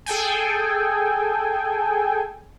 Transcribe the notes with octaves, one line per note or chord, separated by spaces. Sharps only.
G#4 A4 G5 G#5